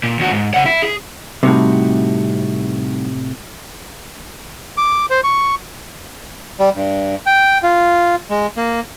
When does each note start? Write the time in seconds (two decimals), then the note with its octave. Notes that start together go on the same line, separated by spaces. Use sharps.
0.03 A#2
0.19 D#2 F#4
0.31 G#2
0.54 C#3 F#5
0.66 E4
0.82 G#4
1.43 A2 C3 G3 D#4 F#4
4.77 D6
5.10 C5
5.24 C#6
6.60 G3
6.75 G2
7.26 G5
7.63 F4
8.30 G#3
8.57 A#3